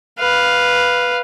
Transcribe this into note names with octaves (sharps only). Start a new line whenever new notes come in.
B4 F5